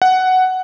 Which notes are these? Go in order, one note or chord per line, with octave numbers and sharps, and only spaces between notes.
F#5